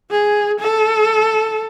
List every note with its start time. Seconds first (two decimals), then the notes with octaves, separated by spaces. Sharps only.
0.11 G#4
0.60 A4